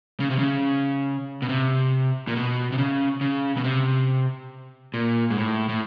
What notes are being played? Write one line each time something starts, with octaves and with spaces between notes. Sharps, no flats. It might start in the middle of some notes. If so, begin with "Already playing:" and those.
C#3
C3
C#3
B2
C3
A#2
B2
C3
C#3
C#3
B2
C3
A#2
G#2
A2
A2